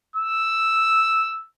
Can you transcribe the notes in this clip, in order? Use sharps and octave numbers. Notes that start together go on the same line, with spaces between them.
E6